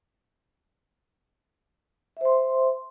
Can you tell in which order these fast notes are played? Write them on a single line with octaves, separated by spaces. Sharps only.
E5 C5 C6